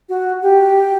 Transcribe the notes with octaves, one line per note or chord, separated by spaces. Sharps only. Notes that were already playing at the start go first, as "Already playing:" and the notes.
F#4
G4